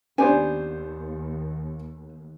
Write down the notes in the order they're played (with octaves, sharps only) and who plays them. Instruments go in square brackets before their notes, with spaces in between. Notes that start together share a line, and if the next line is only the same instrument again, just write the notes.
[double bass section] D#2 [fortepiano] B3 D4 C5 [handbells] C#4 [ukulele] G4 G#5